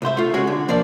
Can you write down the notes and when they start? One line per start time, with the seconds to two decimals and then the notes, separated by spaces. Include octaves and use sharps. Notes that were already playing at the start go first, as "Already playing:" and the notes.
0.02 C2 G#2 C5 E5
0.17 A3 F4
0.34 C#3 G#3 F#4 G#4
0.47 D3
0.68 B1 F3 A#3 D4 D5